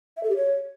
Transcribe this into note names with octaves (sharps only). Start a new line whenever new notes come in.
E5
A4
G4
C#5